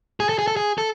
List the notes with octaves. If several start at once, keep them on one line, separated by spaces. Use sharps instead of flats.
G#4
A4
G#4
A4
G#4
A4